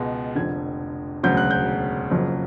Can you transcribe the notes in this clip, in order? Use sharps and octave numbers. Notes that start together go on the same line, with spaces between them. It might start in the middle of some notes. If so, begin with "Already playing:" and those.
Already playing: C#2 B2 G#3 B3
F1 F2 D3 G#6
E1 D2 C#3 F#3 G6
F#6
G6
F#1 F2 C#3 F#3